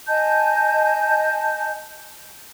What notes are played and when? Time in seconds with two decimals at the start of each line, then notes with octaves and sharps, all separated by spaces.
0.07 D#5 G#5 A5 G6